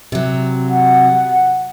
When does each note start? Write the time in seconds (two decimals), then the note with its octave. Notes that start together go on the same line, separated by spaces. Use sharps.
0.12 C3 F#3
0.69 F#5